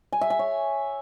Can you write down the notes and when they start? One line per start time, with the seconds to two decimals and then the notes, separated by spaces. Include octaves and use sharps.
0.13 G#5
0.21 E5
0.30 G#5
0.39 C#5